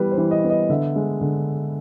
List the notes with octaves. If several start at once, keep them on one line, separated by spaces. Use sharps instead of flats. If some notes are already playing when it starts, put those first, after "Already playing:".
Already playing: E3 G3 B3 B4
C5
E3
D#5
B3
D#5
D3 E5
G#3
D3